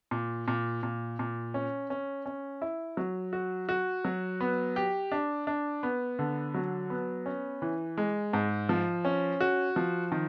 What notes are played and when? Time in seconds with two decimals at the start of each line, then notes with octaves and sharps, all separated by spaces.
0.11 A#2
0.48 A#2
0.83 A#2
1.19 A#2
1.54 C#4
1.90 C#4
2.26 C#4
2.62 E4
2.97 F#3
3.33 F#4
3.69 F#4
4.05 F#3
4.41 B3
4.76 G4
5.12 D4
5.47 D4
5.83 B3
6.19 D3
6.54 F#3
6.90 B3
7.26 C#4
7.62 E3
7.97 G#3
8.33 G#2
8.69 F3
9.05 C#4
9.41 F#4
9.76 F3
10.12 D#3